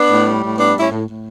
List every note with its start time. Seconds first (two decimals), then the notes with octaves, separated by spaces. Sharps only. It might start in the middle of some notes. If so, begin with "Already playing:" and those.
Already playing: B3 D4
0.10 A2
0.25 G3
0.42 A2
0.58 G3 B3 D4
0.74 A2
0.80 C#4 E4
0.91 A2
1.07 A2